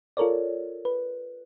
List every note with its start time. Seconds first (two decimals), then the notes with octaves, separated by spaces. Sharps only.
0.17 F4 A4 A#4 C#5 D5
0.85 B4